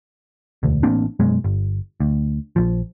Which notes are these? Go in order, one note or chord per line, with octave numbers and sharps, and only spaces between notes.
E1 D2
A1 A#3 C4 D4
F#2 B2 G#3
G1
D2
A#1 F3